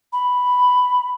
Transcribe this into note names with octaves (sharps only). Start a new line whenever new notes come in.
B5